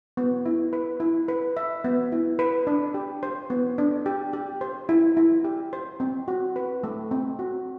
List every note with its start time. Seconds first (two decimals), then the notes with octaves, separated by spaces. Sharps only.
0.17 B3
0.46 E4
0.73 B4
1.00 E4
1.28 B4
1.57 E5
1.84 B3
2.12 E4
2.39 B4
2.67 D4
2.94 G4
3.23 C5
3.50 B3
3.78 D4
4.06 G4
4.33 G4
4.61 C5
4.89 E4
5.17 E4
5.44 G4
5.73 C5
6.00 C4
6.28 F#4
6.56 B4
6.84 A3
7.11 C4
7.39 F#4